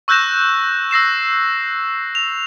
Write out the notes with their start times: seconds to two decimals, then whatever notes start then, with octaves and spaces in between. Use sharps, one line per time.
0.08 C#6 E6 F#6 G6 A#6 E7
0.91 E6 A#6 C7 E7
2.15 F7